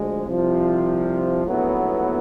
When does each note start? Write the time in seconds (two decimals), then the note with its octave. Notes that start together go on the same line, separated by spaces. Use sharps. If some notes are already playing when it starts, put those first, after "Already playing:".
Already playing: D2 F3 G#3
0.26 C2 C3 F3
1.46 A#1 A2 F#3 B3 E4